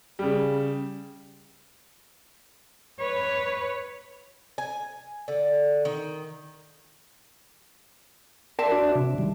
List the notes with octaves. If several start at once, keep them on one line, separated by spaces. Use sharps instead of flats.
C#3 G3
B4 C#5
G#5
D3
D#3
A#4 D5 E5 A5 C6
D4 F#4 D5
C3
D#3 G3